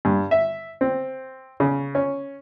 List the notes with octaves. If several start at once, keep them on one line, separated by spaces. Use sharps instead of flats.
G2
E5
C4
C#3
C#4